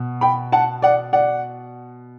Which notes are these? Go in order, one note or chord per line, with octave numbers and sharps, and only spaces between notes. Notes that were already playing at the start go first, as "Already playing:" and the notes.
Already playing: B2
G5 B5
F#5 A5
D5 F#5
D5 F#5